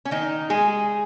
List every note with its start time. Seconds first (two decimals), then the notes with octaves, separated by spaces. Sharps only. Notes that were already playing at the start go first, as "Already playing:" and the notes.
0.05 C#4
0.11 D#3 D#4
0.50 G#3 G#4